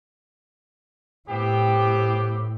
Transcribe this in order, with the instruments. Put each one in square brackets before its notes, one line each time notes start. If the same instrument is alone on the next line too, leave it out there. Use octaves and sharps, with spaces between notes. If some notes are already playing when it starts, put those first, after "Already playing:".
[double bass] A2 [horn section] B3 C4 G4